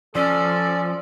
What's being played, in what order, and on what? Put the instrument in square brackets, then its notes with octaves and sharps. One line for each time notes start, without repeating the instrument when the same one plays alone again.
[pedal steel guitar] F3 [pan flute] C#4 [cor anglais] A4 [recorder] D5